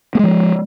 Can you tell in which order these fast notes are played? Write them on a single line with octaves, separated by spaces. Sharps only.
A#3 G#3 F3